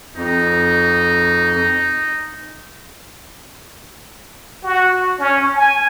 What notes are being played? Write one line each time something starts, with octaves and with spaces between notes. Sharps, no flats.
F2 D#4
F#4
C#4
G#5